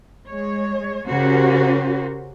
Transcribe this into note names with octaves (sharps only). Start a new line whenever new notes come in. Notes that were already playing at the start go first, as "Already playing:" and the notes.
G#3 C#5
C#3 C#4 F#4 G4 A#4 C5